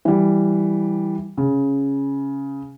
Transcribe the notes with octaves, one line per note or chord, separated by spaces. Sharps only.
E3 G3
C#3